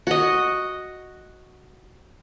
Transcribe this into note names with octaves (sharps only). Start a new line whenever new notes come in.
F#4 D#5